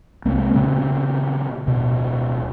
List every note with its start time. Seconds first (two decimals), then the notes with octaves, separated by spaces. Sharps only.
0.25 C2 G#3 A#3 C4
0.54 A#2 C#3 C4
1.67 D1 B2